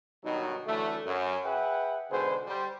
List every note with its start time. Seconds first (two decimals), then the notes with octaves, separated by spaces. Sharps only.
0.24 G2 B2 D#3 F#3 D#4
0.67 D3 E3 F#3 A3
1.06 F#2
1.44 G#4 B4 E5 F#5 G5
2.11 G#2 B2 D3 G#4 B4 C5
2.47 G3 C5